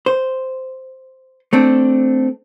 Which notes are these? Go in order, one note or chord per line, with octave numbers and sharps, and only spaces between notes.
C5
A3 C4 D4